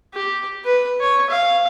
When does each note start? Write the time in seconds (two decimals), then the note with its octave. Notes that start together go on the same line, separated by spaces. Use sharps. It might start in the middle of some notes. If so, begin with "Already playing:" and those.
0.14 G4
0.65 B4
1.00 C#5
1.30 F5